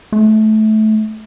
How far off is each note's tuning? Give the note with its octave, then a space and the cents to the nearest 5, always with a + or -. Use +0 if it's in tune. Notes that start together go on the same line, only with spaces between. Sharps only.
A3 -20